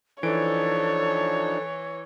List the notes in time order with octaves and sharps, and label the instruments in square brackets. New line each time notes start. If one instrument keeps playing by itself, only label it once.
[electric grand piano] E3 D7 [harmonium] F3 D4 D#4 [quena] A4 [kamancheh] C#5